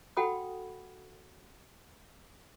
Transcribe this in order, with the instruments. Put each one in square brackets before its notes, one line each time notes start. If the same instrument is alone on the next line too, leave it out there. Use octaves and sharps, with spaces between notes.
[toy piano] F#4 A4 F#5 G5 B5 D#6